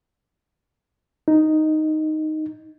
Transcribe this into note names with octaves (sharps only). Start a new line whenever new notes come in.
D#4